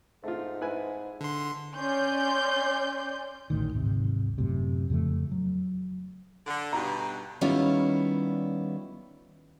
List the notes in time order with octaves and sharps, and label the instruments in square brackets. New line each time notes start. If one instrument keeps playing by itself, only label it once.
[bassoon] G#2 [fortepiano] A3 F4
[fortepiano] E4 B4 G#5
[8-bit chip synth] D3 C6
[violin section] C#4 D5 C6 G6
[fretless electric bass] A1 D2 A2 D#3
D1 G#1 C3
F#2 A2 C3
F2 C#3 F3 A3
F#3
[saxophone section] D3
[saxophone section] G2 B2 [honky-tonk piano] A#5
[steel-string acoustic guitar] D#3 G3 B3 C#4 E4 F4